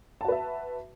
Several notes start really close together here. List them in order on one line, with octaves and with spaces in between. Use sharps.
A5 F#4 B4 E5